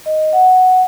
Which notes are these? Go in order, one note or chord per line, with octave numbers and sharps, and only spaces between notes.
D#5
F#5